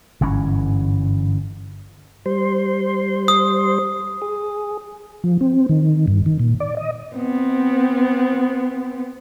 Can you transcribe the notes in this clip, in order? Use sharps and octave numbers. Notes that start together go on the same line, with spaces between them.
G1 G#2 E3 C#4
G3 C5 C6
D#6
G#4
F3
C4
D#3
G2
D#3
A#2
D5
D#5
B3 C4